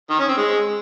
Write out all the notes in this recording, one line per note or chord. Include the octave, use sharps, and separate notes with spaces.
D#3
C#4
C4
G#3